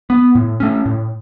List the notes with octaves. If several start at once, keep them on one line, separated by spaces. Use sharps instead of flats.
B3
A2
A3 C#4
A2